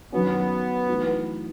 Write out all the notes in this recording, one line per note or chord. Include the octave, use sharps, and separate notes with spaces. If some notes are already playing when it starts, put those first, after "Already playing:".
F#2 D#3 F#3 B3 C#4
E3 A3 D#4 F#4